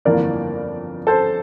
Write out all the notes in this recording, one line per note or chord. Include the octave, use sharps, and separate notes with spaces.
G1 F2 E3 A#3 A#4 D5
A4 C5